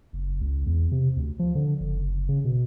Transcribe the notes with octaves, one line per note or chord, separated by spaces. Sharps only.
F#1
C#2
E2
C3
D2
F3
D3
F#1
C#3
B2